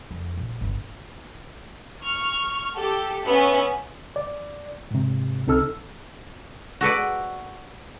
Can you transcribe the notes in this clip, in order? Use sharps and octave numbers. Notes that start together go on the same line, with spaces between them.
F2
A#1
G1
C#6 F6
G4 A4
B3 C#4 E5
D5
G#2 C3
C2 C4 D#4 A4 E6 F6
F#4 A4 B4 D5